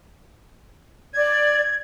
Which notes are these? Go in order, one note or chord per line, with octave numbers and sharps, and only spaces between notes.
D5 G#6